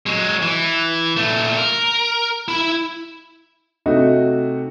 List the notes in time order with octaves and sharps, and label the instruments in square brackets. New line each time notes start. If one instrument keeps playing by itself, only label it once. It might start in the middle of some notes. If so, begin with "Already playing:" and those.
[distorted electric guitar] F#3 G#3
E3
A#2 A3
A#4
E4 B5
[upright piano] C3 A3 D#4 F#4